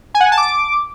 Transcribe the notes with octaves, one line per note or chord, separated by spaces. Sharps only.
G#5
F#5
G#5
A5
D6